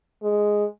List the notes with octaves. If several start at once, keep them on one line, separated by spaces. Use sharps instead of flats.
G#3